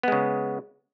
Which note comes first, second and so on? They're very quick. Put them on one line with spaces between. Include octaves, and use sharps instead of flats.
B3 G#3 C#3